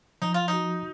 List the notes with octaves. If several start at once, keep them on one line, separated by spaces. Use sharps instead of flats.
F3 D#4
F4
D#4
F#4